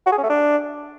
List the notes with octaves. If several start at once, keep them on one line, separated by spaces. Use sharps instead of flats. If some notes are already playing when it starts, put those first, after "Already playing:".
F#4
G#4
C#4
A3
D4